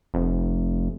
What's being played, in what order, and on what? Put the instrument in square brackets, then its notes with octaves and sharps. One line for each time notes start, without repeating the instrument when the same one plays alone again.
[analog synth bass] F1